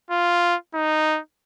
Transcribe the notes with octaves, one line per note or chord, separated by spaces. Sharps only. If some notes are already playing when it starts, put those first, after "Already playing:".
F4
D#4